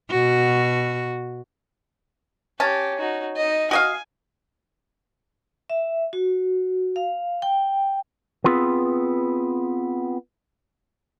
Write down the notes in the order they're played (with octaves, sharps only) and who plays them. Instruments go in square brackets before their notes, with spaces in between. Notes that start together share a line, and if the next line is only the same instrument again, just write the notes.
[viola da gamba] B2 F#4
[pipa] C#4 A5 [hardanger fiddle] G4
[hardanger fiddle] D#4 F#4
D#4 D#5
[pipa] F#4 D#5 F5 [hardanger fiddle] G#5
[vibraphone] E5
F#4
F5
G5
[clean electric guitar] B3 C4 F4 G#4 B4